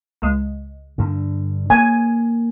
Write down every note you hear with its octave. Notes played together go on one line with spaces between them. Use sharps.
C#2 G#3
G2 D3
A#3 G#5